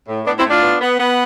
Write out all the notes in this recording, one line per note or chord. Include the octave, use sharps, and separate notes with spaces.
A2
A2 B3 D4
C4 E4
A2
D4 F4
B3
B3
B3